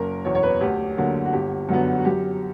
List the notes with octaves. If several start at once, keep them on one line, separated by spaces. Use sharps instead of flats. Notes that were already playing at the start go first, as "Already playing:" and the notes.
Already playing: F#1 A#4
E2 B2 C#5
C#5
B4
D2 G4
D3 F#3 A#3
F#4
G1 G4
F#2 D3 F#3 B3
F#4
F#2 G4